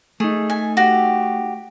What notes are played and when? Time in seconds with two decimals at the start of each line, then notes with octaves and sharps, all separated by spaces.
0.20 A3 D#4 G#4
0.50 G#5
0.77 F#4 G4